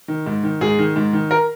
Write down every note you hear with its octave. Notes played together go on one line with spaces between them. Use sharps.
D#3
G#2
D#3
G#2 G#4
D#3
G#2
D#3
A#4